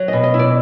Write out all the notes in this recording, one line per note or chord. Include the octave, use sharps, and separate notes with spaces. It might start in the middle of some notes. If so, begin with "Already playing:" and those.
Already playing: F#3
D#5
B2
D#5
E4
D5